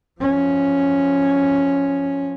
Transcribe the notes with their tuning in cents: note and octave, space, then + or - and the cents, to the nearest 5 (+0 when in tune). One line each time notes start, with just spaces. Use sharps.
F3 +0 C#4 +0